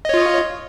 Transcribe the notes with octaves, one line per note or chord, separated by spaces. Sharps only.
F4 C#5 D#5